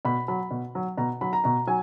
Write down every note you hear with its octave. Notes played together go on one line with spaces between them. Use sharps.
B2 B5
F#3 B5
B2
F#3
B2 A#5
F#3 B5
A#5
B2 A#5
F#3 G#5